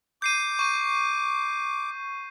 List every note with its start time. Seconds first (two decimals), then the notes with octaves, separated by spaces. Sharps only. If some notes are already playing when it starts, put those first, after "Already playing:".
0.22 D6 G6 C7 D#7
0.59 C#6 D#7